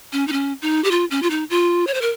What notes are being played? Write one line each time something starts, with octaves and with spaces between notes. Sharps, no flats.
C#4
D#4
C#4
D#4
G4
F4
C#4
F4
D#4
F4
C#5
C5
A#4